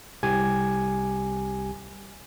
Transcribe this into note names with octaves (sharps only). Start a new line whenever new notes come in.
C2 G4 G#5 G#6